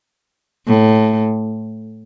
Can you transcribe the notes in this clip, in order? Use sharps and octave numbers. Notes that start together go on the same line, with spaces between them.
A2